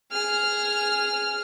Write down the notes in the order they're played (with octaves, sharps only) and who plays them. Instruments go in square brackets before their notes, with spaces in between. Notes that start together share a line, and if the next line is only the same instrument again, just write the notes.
[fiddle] G#4 F6